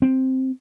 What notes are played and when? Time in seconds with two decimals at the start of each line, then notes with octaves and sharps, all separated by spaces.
0.02 C4